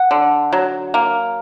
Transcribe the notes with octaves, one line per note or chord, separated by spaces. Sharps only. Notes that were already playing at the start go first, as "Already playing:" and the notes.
Already playing: F#5
D3
F#3
A#3